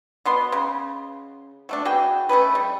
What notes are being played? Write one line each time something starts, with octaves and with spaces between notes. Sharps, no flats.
B2 B3 C6
C#3
F#3 A3 D4
E3 F#4 G#4 G5
A3 C#4 G#4 B4
G3